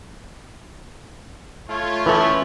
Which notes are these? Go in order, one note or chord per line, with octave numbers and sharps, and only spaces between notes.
A3 F4 C#5
E3 F3 C#4 E4 A4 C#6